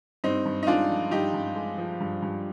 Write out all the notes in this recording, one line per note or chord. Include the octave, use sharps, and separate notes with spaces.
G2 C4 D#4
G2
D#4
G#3 D4 F4
F3
G2 D#4 G4
G2
G#3
F3
G2
G2